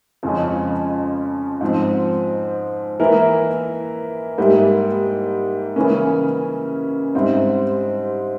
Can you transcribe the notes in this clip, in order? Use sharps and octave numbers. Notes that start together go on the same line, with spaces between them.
F2 C#3 F3 G#3 C#4
G#2 F3 C4
E3 A#3 E4 A#4
G#2 G3 A#3 E4 G4
C#3 E3 A#3 C#4
G#2 G3 C4 E4